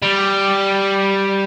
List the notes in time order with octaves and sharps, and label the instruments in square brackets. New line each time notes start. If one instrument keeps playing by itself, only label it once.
[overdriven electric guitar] G3